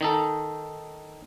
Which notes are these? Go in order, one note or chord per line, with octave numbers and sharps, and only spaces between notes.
D#3 D#4 A4